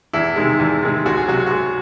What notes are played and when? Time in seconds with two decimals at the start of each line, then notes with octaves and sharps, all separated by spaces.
0.13 E2 E4
0.36 C3 D#3 G#3
0.59 E2
0.82 C3 D#3 G#3
1.05 C#2 F#4
1.17 G#4
1.28 C3 F#3 F#4
1.46 F#4
1.51 C#2 G#4